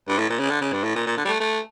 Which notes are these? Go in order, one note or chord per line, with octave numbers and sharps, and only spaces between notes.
G2
A2
A#2
C#3
D3
C#3
G2
A2
A#2
A#2
D3
G3
A3
A3